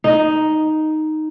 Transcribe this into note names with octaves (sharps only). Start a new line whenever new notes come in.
D#4